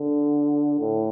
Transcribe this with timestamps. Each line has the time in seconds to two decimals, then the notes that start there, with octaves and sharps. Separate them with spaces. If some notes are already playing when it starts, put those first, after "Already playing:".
Already playing: D3
0.80 A2